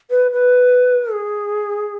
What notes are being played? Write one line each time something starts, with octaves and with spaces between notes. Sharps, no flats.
B4
B4
G#4